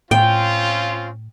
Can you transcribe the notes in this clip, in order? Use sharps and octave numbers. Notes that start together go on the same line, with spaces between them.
A2 C4 C#4 F4 G5